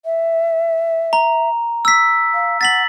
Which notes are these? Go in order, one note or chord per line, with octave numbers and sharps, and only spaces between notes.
E5
A#5
E6 B6
F5
F#5 A6 B6 F#7